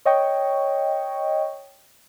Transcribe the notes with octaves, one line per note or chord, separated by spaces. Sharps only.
C#5 D#5 G5 C#6